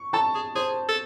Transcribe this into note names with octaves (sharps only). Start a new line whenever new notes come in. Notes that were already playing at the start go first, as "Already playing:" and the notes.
Already playing: C#6
A4 A5
G#4
G#4 C5
A4